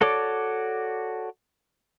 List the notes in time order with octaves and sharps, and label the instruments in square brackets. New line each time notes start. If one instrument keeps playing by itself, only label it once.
[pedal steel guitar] F#4 A4 C#5 D5 D6